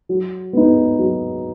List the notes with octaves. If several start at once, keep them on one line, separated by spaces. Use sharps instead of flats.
F#3
B3 D#4
F#3